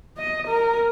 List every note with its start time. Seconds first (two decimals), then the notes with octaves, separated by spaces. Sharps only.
0.17 D#5
0.47 A#4